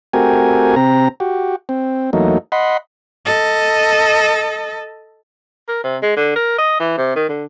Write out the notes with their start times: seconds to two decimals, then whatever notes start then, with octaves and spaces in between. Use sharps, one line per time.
0.13 A3 C4 F#4 G4 A#4 G#5
0.76 C3 C4 A#5
1.20 F#4 G4
1.69 C4
2.13 E2 F#3 A3 A#3 D#4
2.52 D#5 F#5 B5 C6
3.26 A4 D#5
5.68 A#4
5.84 C3
6.02 G#3
6.17 D3
6.36 A#4
6.58 D#5
6.80 E3
6.98 C3
7.16 D#3
7.29 D3